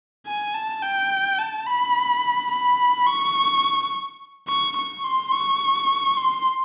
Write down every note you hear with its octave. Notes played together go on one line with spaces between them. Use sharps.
G#5
A5
G5
A5
B5
B5
C#6
C#6
C#6
C6
C#6
C6